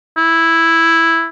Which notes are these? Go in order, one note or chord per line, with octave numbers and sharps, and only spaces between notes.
E4